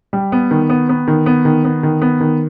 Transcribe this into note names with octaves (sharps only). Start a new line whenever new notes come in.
G3
B3
D#3
B3
B3
D#3
B3
D#3
B3
D#3
B3
D#3